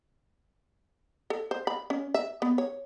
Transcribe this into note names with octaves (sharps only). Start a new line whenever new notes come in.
A4
C5
B5
C#4
E5
B3
C#5